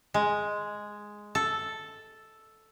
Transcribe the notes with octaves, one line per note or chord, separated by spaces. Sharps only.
G#3
A4